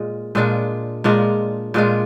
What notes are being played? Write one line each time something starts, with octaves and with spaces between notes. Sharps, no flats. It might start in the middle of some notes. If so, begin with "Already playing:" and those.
Already playing: A#2 G#3 F4
A#2 G#3 D4 F4
A#2 G#3 D4 F4
A#2 G#3 D4 F4